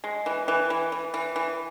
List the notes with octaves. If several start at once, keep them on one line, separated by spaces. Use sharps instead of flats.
G#3
E3
E3
E3
E3
E3
E3